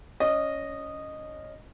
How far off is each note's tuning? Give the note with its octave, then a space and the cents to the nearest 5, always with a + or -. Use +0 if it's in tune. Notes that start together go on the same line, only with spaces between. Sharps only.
C#4 +10 D#5 -10